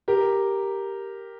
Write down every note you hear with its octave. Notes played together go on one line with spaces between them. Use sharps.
G4 A#4